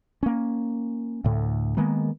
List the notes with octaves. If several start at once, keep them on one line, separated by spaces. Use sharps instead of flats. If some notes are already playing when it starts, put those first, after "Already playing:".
A#3 C#4
D2 A2
D#3 G#3 A#3 B3